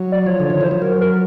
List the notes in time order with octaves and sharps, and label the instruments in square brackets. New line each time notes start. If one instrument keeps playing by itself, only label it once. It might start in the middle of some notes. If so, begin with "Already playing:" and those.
Already playing: [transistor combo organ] F#3
[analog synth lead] D5
[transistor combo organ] F3 [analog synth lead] C#5
[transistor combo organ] D3
[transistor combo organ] D#3 [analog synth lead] C#5
[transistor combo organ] E3 [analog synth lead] C5
[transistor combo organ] F3
[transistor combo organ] F#3 [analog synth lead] A#4
[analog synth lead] A#4